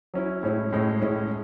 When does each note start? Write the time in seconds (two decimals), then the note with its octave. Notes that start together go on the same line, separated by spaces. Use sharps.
0.14 F#3 C#4 E4
0.43 A2 G#3 C#4 E4
0.73 A2 G#3 C#4 E4
1.01 A2 G#3 C#4 E4